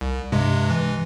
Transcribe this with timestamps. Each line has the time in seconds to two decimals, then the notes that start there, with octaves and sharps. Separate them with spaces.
0.01 C2
0.32 G2 C3 G#3
0.70 E3